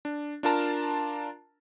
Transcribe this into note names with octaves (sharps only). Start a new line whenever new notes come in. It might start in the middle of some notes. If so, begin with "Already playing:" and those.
D4
D4 F4 A#4 A5 A#5